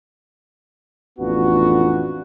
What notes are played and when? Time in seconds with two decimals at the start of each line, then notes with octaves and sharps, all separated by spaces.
1.19 A1 F2 B3 D4 F4 F#4